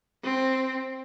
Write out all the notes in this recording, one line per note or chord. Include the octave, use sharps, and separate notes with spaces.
C4